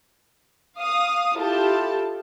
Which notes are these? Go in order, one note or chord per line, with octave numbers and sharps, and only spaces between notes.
F5 D#6
E4 F4 G4 A4 A5